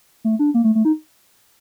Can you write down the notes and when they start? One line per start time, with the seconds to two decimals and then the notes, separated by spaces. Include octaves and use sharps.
0.24 A3
0.39 D4
0.54 A#3
0.64 A3
0.75 A3
0.85 D#4